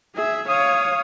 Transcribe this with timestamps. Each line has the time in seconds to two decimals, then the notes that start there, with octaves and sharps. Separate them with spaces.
0.15 G#4 E5
0.48 C#5 F5 D#6